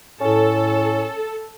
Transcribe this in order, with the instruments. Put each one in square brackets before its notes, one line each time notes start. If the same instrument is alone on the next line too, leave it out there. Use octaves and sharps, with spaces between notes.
[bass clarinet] A2 [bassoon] C#4 [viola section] A4